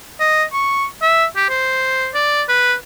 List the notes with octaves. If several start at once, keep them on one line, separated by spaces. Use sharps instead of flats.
D#5
C#6
E5
G4
C5
D5
B4